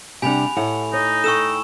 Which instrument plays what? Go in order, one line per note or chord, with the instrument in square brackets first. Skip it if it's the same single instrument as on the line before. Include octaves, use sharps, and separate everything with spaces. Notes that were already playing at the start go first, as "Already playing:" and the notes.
[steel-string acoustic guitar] C3 G3 D4 [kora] G4 F#5 [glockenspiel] G#5 B5 F7
[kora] A2 [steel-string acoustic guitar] F#5
[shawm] D#4 [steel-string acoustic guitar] C#5
[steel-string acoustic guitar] A4 G5 [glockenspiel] C#6 E6 E7